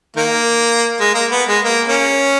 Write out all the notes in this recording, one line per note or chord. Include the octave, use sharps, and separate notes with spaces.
D#3 A#3
G#3
A#3
B3
G#3
A#3
A#3 C#4